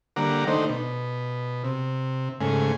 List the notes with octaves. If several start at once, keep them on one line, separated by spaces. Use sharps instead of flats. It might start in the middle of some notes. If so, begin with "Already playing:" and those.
D3 G3 A#3 F#5 A#5 D6
D#3 A3 D4 D#4 C5
B2
C3
G#2 C#3 A3 G#5